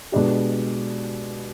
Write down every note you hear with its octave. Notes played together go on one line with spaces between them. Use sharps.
B2 G#3 D4 G4